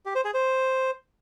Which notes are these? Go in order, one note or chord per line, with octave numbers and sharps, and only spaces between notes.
G4
C5
G#4
C5